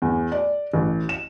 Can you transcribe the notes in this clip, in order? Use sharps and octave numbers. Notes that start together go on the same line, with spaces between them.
E2
D5
A1
E7